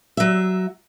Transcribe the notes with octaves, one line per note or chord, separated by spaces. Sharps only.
F#3 E5